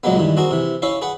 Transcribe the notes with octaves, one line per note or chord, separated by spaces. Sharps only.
C#2 A#2 F#3 G#3 A#3 B3
G2 D#3 E3
C4 F#4 G#4 A#4
C3 E3
C#4 E4 C#5 E5 F5
G#4 B4 F#5